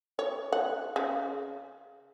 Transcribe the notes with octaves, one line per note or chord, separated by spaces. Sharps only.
C#5
F#5
C#3